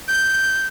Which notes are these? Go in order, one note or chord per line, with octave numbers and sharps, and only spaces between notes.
G6